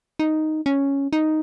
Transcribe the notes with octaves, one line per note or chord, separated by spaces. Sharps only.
D#4
C#4
D#4